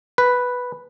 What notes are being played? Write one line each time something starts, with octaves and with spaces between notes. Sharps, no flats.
B4